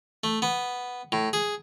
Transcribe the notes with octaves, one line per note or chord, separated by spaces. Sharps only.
A3
B3
A2
G#4